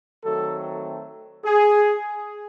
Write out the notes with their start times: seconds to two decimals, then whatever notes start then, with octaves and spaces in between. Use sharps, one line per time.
0.25 D#3 F#3 A3 C4 A4
1.44 G#4